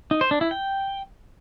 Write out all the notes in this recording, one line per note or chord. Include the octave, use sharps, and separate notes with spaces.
D#4
C5
D4
E4
G5